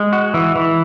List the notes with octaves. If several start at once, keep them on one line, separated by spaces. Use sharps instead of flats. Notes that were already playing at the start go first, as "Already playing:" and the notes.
Already playing: G#3
F#4
E3
E3